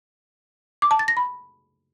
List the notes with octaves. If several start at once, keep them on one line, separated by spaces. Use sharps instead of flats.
D6
A5
A6
A#6
B5